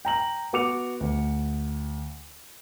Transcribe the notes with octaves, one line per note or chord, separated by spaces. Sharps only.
G5 A#5 F#7
B3 F#4 D6 C#7 F7
D2